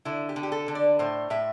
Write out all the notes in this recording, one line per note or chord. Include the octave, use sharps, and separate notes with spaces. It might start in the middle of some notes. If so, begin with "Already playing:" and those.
D3 E4
G4
D3
G4
A4
D3
D5
A2 C5
A2 E5